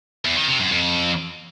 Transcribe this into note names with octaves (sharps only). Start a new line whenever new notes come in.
E2
D#3
C3
F#2
F2